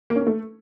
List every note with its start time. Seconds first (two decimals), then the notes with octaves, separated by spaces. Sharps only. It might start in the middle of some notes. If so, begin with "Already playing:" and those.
0.10 A#3
0.16 C#4
0.21 A#3
0.27 A3